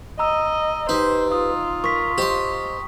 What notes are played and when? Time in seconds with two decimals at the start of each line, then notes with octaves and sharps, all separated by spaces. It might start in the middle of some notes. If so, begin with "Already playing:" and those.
0.19 D#5 A#5 E6
0.89 D#4 G4 B4 C5
1.32 F4 D#6
1.84 A#4 C#6 B6
2.18 G4 C5 D#5 C6